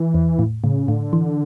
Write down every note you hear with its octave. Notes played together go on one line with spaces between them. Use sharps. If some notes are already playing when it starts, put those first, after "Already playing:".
Already playing: E3
E2
A2
A2 C#3
A2 D3
E3